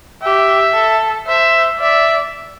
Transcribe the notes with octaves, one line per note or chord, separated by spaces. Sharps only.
G4 E5
A4
C5 E5
D5 E5